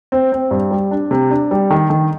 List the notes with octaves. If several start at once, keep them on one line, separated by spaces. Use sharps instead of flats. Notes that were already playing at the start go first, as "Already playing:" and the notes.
C4
C4
G2
G3
D4
C3
D4
G3
D#3
D#3